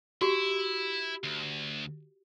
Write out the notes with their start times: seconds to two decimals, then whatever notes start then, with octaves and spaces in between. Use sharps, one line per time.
0.21 E4 F#4 G4
1.24 D2